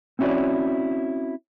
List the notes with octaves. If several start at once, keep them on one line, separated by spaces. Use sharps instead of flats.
C4 C#4 E4 F#4 C#5 D5